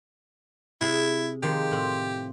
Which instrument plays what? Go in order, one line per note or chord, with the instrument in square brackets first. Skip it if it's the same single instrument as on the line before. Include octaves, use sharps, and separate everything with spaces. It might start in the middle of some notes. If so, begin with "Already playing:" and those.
[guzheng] C3 G#4 G#5 [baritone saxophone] E4
[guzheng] D#3 F3 G#3 [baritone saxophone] G4
[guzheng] A2 C4